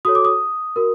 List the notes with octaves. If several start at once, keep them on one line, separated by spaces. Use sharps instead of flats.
F#4 A4 C#5 D#6
D6
D#6
F#4 A#4